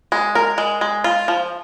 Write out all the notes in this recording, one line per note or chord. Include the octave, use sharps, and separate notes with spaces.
G#3
A#4
G#3
G#3
F4
F3